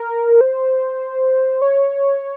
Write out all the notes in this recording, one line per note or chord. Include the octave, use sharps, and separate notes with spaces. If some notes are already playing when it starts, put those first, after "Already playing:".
Already playing: A#4
C5
C#5